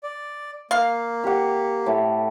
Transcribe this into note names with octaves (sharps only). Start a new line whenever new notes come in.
D5
A#3 F5
G4 F#5
A2